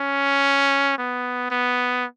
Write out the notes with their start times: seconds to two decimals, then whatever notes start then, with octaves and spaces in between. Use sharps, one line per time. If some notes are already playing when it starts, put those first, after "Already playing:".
Already playing: C#4
0.98 B3
1.51 B3